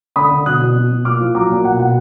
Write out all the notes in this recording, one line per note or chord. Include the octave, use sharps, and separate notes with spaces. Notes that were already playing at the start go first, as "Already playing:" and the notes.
D3 B5 D#6
D3
B2 D#6 F#6
B2
B2
B2
A#2 D6 F6
F3
F#3 A#5 D6
A#2
B2 F#5 A#5
B2 F#5